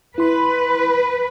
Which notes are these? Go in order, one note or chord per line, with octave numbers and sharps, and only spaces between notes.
E4 B4 C6